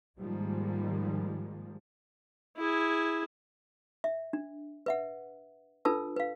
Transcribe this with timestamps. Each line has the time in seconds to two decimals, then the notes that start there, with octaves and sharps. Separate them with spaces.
0.17 G#2 D#3 F3 G3 G#3 A#3
2.57 E4 G#4
4.04 E5
4.33 D4
4.86 B4 E5 F#5
5.85 D4 F4 A4 B4 A5 E6
6.16 B4 F5